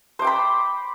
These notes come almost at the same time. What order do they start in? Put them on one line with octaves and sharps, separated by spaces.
C5 D6 G5 B5